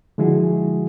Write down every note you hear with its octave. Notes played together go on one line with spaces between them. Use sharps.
D3 F3 G#3 E4 F#4 G#4